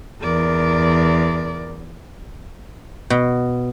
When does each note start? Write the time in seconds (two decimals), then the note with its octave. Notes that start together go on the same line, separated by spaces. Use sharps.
0.22 E2 A#4 D5
3.10 B2